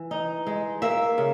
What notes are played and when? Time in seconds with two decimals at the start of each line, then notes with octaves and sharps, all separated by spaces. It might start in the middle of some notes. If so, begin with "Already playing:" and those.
Already playing: E3
0.11 D#4
0.47 G#3
0.82 A#3 E5
1.18 C#3